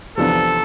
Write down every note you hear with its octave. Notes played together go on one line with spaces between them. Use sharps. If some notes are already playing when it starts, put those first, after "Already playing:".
E2 C3 F3 B3 D4 A4